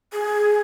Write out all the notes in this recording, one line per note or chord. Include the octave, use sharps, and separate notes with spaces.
G#4